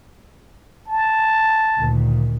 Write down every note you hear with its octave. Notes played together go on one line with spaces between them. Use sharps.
A5
D2 A#2 D#3